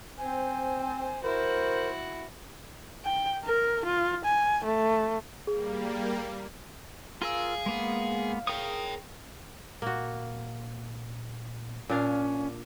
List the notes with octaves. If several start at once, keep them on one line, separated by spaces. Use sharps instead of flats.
C4 C5 G#5
E4 F#4 A#4 C5
G5
A#4
F4
G#5
A3
G3 A#3 G#4
F4 G#4 A#4 F5 E6
G#3 A#3 B3
G#4 A#4 C#5 G5 D#6
A#2 A#3 F#4
A#2 C#4 D4 F5